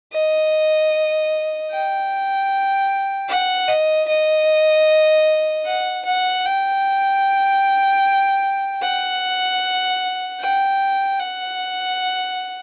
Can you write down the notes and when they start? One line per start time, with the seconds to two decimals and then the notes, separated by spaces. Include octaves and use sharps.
0.13 D#5
1.71 G5
3.29 F#5
3.68 D#5
4.08 D#5
5.66 F#5
6.05 F#5
6.46 G5
8.82 F#5
10.41 G5
11.20 F#5